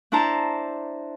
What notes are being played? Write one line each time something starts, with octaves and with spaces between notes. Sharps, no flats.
D4 E4 C5 A5 A#5